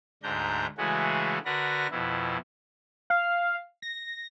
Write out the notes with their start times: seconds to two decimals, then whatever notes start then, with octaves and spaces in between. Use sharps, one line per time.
0.23 D2 G#2 D4 A#5 G6
0.78 C#3 E3 G#3 A3 F#4 G#4
1.45 D3 F#4 A#4 B4 D5 A#6
1.91 F2 B2 E4
3.10 F5
3.82 A#6